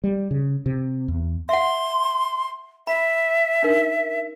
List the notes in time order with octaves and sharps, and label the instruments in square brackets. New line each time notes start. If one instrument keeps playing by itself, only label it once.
[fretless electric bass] G3
C#3
C3
E2
[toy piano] E5 F#5 [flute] C6
[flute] E5 [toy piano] B5
[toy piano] D4 D#4 A#4